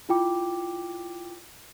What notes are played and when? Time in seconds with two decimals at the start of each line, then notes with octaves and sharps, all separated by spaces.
0.09 E4 F4 G5 D6